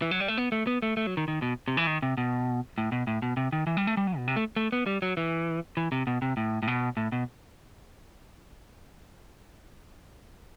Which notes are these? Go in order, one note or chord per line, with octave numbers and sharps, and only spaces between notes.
E3
F#3
G3
A3
B3
A3
B3
A3
A3
F#3
D#3
D#3
B2
C3
E3
D#3
C3
B2
A2
B2
A2
B2
C3
D#3
E3
G3
A3
G3
F#3
B2
C3
A3
A3
B3
G3
F#3
E3
E3
C3
B2
C3
A2
A2
B2
A2
B2